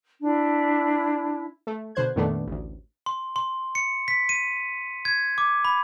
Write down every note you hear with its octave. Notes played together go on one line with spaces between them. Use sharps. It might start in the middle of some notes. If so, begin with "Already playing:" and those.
D4 E4
A3
B2 D3 C5 F#6 G#6
F2 A#2 D#3 A3 B3 D4
A1 D2
C6
C6
C#7
B6
D#7
G#6
D6
B5